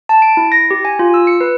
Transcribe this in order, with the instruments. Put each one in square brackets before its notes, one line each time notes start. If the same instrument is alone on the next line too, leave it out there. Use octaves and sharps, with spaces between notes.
[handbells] A5
D7
E4
A#6
G4
G#5
F4
E6
C#7
B4